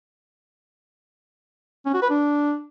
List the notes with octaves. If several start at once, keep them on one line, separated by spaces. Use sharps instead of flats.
C#4
F#4
B4
D4